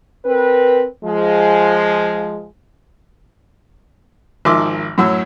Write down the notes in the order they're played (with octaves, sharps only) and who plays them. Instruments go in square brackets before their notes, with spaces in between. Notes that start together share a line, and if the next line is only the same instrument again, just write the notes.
[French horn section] C4 A#4 B4
F3 G#3
[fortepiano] G#1 D#3 F3 E5 C6 D6
F#2 A2 F#3 F#4 E6